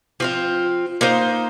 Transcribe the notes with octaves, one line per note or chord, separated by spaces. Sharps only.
F3 C4 F4
A#3 D#4 C5 D#5